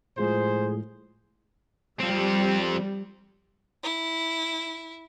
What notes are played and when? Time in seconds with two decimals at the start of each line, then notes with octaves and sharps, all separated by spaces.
0.18 A2 F3 G#3 G#4 C5
2.00 F2 G3 C4
3.83 E4